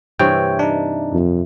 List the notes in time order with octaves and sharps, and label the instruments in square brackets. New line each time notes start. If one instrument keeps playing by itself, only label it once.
[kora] G2 C3 E3 [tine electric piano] C#5 G5
[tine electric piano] D4 D#4
[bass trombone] F2